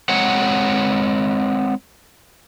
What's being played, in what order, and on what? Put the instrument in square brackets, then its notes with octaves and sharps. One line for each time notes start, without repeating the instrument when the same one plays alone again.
[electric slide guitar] G#3 C4 C#5 F#5